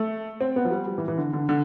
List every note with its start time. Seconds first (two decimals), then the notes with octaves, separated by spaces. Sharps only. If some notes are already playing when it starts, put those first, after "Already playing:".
Already playing: A3
0.41 C4
0.56 B3
0.65 F3
0.71 G3
0.87 G3
0.98 E3
1.08 E3
1.18 D3
1.33 D3
1.49 D3